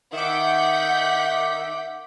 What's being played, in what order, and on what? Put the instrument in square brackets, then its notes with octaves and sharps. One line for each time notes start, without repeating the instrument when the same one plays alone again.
[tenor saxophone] D#3 [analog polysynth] E5 D6 [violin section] F#5 G6 B6